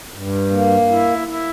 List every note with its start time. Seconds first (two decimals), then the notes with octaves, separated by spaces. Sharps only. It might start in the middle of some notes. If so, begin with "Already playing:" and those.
0.14 G2
0.51 A#3
0.89 E4
1.28 E4